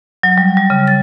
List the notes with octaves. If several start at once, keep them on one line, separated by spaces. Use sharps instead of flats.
F#3
G3
G3
C#3
A6